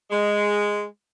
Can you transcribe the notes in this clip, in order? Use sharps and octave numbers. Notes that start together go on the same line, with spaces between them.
G#3